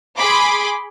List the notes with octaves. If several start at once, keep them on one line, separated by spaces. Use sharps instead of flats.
G#4 B5 C6 D6